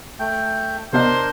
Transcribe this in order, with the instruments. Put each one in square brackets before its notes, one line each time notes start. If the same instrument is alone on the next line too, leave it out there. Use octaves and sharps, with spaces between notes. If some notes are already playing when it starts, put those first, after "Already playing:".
[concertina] A3 G5
[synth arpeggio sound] C3 B3 D#5 [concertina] D4 A#4 [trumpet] C5